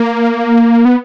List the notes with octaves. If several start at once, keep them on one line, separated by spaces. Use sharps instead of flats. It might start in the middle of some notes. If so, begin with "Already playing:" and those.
Already playing: A#3
B3